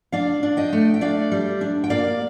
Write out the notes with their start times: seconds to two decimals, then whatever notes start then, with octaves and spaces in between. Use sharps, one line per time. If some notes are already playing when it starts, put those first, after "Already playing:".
0.12 D4 D5 F5
0.43 D4
0.57 D#5 G5
0.73 A3
0.94 G5
1.01 D4 D5 F5
1.31 G3
1.61 D4
1.84 G5
1.90 A#3 D5 F5